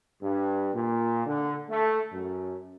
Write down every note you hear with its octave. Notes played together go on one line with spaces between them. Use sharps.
G2
A#2
D3
A3
F#2